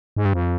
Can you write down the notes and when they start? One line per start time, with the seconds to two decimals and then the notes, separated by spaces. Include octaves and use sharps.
0.17 G#2
0.25 G2
0.33 F2